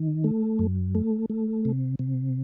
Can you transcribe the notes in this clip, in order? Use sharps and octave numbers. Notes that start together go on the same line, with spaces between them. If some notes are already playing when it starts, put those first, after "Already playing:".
Already playing: D#3
A3
F#2
A3
A3
C3
C3